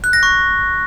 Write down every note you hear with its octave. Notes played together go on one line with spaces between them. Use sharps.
F#6
A#6
C#6